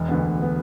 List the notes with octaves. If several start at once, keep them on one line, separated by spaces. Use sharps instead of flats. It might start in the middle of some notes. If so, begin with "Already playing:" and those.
Already playing: E1
D2 D3 B3
E1
D3 B3